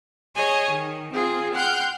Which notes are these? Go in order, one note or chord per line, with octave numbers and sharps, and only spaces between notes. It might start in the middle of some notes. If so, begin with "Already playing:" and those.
G#4 C#5 D#5 G#5
D#3
C4 F4 G#4
F#5 G5 C6 F6 G6